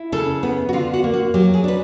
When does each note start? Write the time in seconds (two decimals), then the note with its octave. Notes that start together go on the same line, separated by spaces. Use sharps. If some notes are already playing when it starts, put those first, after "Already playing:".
Already playing: E4
0.12 C#3 A4
0.43 B3
0.69 F#4
0.73 D3 F4
0.93 F#4
1.04 A#3
1.14 F#4
1.34 F#3 G4
1.54 G#4
1.64 D4 B4